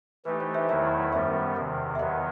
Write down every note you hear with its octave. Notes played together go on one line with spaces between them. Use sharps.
E3 A3 D#4 G4 B4
C5
C5 E5
E2 D#3 F#3 A3 E4 C5 E5
F#2 D#3 G3 B3 C5 E5
E2 C3 D#3
E5
E2 D#3 F#3 B3 D#5 F#5